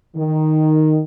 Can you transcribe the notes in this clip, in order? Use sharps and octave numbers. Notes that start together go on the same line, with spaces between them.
D#3